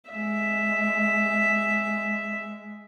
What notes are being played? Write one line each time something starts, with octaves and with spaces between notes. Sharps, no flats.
G#3 E5